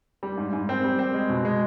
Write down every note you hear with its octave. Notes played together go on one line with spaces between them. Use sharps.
G3
G#2
G#2
C4
G3
C4
G#3
B2
G#3